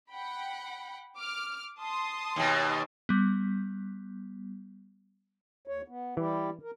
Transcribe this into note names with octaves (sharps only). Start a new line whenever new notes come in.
F#5 G5 B5
D6 F6
A5 C6 D#6
D#2 B2
G3 B3
D#2 C#5
B3
E3 G3 E4 G4
A#4